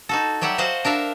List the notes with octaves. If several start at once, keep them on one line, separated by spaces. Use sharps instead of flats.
D#4 F#4 A4
F#3 G3 G4 E5 F#5
F#4 C5 D#5 F5 F#5
D4 A#4 E5 F5